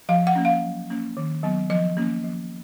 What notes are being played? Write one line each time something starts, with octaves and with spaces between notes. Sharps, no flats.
F3 F5
F#5
A#3 C#4
F5
F#3
A#3 C#4
D#3
F#3 B3
F3 D#5
A#3 C#4
F3